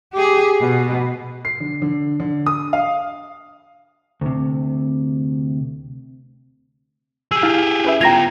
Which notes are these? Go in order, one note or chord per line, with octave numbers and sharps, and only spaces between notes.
G4 G#4
B2
C7
D3
D3
D3
D#6
F5
D2 C3
G4 G#4 E6
E4 F5
C#4 B4 E5
B3 F4 G5 A#5 G#6 A#6 F7